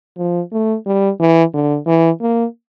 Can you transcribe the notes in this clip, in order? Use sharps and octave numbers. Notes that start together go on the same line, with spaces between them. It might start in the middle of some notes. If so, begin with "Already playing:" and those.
F3
A3
G3
E3
D3
E3
A#3